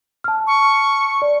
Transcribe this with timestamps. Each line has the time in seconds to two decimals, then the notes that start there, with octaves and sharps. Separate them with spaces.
0.24 A5 F6
0.47 C#6
1.22 D5